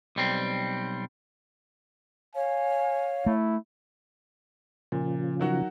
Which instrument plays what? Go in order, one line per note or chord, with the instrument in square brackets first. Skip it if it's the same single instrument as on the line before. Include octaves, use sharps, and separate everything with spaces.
[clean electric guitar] B1 G3 C4
[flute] C#5 [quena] F5 [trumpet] G#5
[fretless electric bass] A3 [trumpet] E4
[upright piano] A#2 [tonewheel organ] C#3 F3
[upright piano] D#3 F#3 F#4